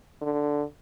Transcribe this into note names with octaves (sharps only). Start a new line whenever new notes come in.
D3